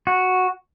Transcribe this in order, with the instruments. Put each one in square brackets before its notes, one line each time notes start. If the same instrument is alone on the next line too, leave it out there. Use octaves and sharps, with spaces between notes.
[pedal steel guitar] F#4